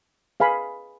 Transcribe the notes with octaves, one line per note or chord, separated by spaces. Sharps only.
G#4 B4 F5 G#5 B5